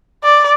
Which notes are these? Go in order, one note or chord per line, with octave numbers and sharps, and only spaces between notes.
D5